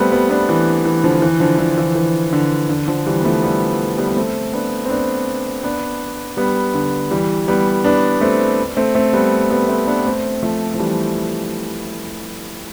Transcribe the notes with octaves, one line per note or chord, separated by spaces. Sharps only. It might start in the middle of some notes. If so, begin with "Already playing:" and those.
Already playing: G3 A3 B3 C4
G3 B3
B3 D4
E3
E3
D3 F3
E3
D3 F3
D3 F3
E3
E3
D3
D3
D3 F3
E3 G3
B3
F3 A3
G3 B3
G3 B3
B3
A3 C4
B3 D4
C4
B3 D4
B3 D4
G3 B3
D3
E3 G3
G3 B3
B3 D4
A3 C4
A3 C4
A3 C4
G3 B3
G3 B3
A3 C4
B3 D4
A3 C4
F3 A3
F3
E3 G3